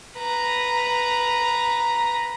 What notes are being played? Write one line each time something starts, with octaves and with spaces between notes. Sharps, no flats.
B4 A#5